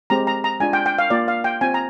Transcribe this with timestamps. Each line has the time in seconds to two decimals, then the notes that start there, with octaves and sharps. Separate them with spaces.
0.10 G#3 C4 G4 A#5
0.27 A#5
0.44 A#5
0.60 G#3 D4 F4 G#5
0.73 G5
0.86 G5
0.98 F5
1.10 A#3 F4 D5
1.28 F5
1.44 G5
1.61 C4 F4 G#5
1.74 A#5